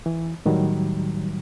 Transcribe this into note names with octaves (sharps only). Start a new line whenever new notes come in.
E3
A2 D#3 F#3 G3